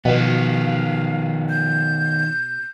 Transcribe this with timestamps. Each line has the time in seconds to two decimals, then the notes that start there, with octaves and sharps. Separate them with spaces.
0.05 B2 D#3 F3 B3 F5
1.50 G6